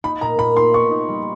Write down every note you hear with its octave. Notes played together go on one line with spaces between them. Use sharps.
D#4 B5
A#2 A#5
A#2 B5
D#4 C6
B3 C#6
D#4
G3